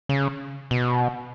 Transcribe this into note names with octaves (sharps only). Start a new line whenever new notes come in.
C#3
B2